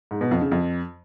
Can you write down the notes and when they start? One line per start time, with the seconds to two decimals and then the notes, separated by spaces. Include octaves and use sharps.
0.11 G#2
0.21 B2
0.31 F2
0.41 C#3
0.51 F2